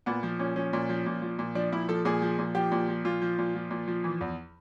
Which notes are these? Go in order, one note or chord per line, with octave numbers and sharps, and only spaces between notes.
A#2 B3
F3
A#2 C#4
F3 C#4
A#2
F3
A#2
F3
A#2
F3 D4
A#2 E4
F3 A4
A#2 G#4
F3
A#2
F3 G4
A#2
F3
A#2 F4
F3
A#2
F3
A#2
F3
E3
E2